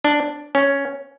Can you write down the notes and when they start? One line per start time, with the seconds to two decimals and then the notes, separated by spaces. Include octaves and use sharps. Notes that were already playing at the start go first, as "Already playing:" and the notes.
0.04 D4
0.55 C#4